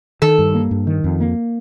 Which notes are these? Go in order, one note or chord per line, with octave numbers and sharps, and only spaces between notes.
D#3 A4
G2
A#3
G2
D#3
F2
A#3